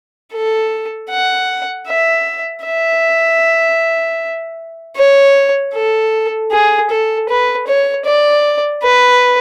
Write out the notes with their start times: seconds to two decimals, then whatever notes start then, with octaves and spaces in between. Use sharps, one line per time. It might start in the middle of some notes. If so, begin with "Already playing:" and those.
0.33 A4
1.10 F#5
1.87 E5
2.65 E5
4.96 C#5
5.74 A4
6.52 G#4
6.90 A4
7.28 B4
7.67 C#5
8.05 D5
8.83 B4